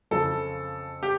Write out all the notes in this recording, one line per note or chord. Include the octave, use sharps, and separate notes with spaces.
F2 C#3 F3 A4
G4